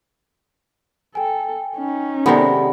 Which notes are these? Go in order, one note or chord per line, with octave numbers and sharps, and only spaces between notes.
A4 G5 G#5
C#4 D#4
C3 D#3 G#3 B3 A4 C5 D5